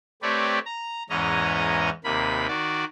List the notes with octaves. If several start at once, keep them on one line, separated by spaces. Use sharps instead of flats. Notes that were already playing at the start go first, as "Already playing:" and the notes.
A3 C4 G4 B4 C#5 D5
A#5
E2 G#2 E3 C#4 D#5 A#5
D#2 C3 A#3 B5
D#3 F#4 D5